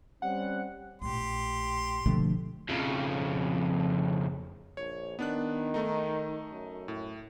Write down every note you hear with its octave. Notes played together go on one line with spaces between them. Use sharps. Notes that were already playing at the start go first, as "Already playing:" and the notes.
G3 C4 C#4 F#5
A#1 A2 G4 C6
B2 D3 F3 A3
F2 C#3
A#1 C#5
D#3 B3 D4 F#6
A3 D#4
F#2
A2